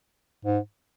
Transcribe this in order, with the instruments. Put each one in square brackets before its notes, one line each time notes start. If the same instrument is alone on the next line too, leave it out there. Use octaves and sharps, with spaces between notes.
[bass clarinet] G#2